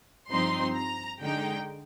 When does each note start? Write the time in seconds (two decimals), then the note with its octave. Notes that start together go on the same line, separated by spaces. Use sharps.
0.30 G2 F3 C4 D#4 C6
0.76 A#5
1.21 D3 G#3 D#4 G5